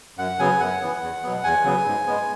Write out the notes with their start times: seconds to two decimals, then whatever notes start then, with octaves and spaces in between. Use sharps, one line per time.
0.18 F#2 F#5
0.39 C#3 F#3 B3 G#5
0.60 F#2 F#5
0.81 E3 B3
1.01 E2
1.23 B2 F#3 B3
1.44 E2 G#5
1.64 C#3 F#3 B3
1.86 G#2
2.07 G#3 B3